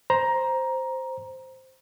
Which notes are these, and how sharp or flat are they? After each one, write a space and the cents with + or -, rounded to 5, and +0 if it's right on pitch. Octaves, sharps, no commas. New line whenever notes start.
C5 +0 A#5 +15